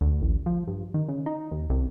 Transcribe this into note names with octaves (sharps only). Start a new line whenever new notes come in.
D2
A1
F3
G2
D#3
C#3
D#4
D#2
C2